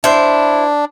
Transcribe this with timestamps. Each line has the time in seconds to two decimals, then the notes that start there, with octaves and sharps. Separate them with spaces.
0.04 D4 E4 C5